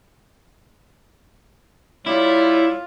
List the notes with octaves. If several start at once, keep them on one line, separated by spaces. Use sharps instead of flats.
G3 E4 F4 C#5